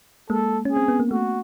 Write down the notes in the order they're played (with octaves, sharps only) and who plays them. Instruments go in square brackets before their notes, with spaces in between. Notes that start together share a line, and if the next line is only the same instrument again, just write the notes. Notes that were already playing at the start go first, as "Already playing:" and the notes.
[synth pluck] G#3 A#3 [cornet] A4
[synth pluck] C#4
[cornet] G#4
[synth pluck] C4
B3
A#3
[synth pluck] A3 [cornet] F#4